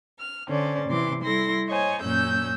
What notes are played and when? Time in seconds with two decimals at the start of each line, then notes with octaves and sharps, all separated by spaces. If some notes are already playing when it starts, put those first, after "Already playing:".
0.18 F6
0.48 D3 C#4 C5 D5
0.89 C3 E3 C6 D6
1.23 G3 E4 A4 C6 A#6
1.68 C5 C#5 D#5 G#5
2.00 F#2 A#2 C#4 E6 G6